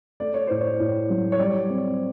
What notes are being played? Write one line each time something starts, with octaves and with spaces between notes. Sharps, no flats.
A3 D5
C#5
A2 C5
C#5
A2
F#3
C#5
G3 D5
C4